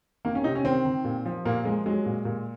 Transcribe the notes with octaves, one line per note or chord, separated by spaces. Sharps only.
D#3 A#3
C#4
C3 D#4
C#4
D#3 C4
D#3
A#2
F3
A#2 A#3
F3 G#3
F#3 G#3
A#2
A#2